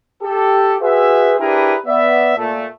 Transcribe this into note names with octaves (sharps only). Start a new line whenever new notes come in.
G4 A4
F#4 G#4 B4 C5 E5
D4 E4 G4 G#4 A#4 B4
B3 D5 E5
A#2 A3